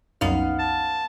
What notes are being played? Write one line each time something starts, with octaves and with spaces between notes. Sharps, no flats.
C2 F#2 B3 D#4 F5
A5